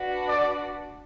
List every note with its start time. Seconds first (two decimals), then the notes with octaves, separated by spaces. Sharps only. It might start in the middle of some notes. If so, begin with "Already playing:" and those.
Already playing: D4 F#4 B4
0.28 D5